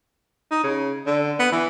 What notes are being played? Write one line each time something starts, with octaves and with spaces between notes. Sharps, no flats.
D#4
C#3
D3
B3
E3